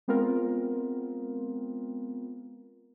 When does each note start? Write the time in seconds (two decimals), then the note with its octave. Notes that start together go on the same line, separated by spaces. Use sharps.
0.08 G#3 B3 C4 F4 A#4